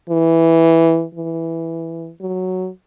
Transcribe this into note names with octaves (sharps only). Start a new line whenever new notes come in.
E3
E3
F#3